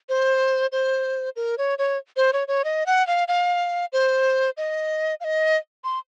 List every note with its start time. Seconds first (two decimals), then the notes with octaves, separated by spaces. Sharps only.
0.09 C5
0.72 C5
1.36 A#4
1.58 C#5
1.78 C#5
2.17 C5
2.33 C#5
2.48 C#5
2.64 D#5
2.86 F#5
3.07 F5
3.28 F5
3.93 C5
4.57 D#5
5.20 F5
5.24 D#5
5.84 C6